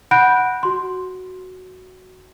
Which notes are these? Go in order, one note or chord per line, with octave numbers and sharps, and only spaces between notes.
F#5 B5 F#6 G6 A#6 D7
F#4 C6